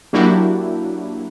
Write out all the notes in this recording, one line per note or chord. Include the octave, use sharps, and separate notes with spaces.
F#3 A#3 D4 E4 F#4 G4